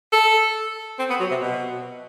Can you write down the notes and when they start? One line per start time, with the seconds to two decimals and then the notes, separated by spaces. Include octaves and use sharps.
0.12 A4
0.99 C4
1.10 B3
1.20 F#3
1.31 C3
1.41 B2